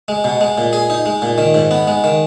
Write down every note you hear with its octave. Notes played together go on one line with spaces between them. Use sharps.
G#3
B2
G#3
A#2
G#4
D#4
G#3
A#2
D#3
G#2
B3
G#3
D#3